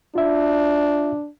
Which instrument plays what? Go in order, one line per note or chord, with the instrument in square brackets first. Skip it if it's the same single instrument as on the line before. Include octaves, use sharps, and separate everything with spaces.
[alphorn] D4 [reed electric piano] F4 E5